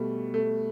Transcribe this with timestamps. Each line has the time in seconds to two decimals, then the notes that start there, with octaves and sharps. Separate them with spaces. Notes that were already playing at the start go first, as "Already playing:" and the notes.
Already playing: B2 G3 A3
0.34 A3